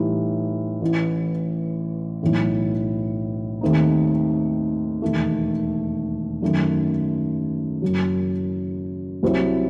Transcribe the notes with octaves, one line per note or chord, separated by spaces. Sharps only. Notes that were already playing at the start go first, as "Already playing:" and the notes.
Already playing: A2 E3 G3 D#4
A1 A2 E3
B1 A2 E3
D#2 D#3 A3 C4 D#4
E1 D#2 D#3 A3
F#2 D#3 A3
F#1 F#2 F#3
C2 C3 F#3 C4 E4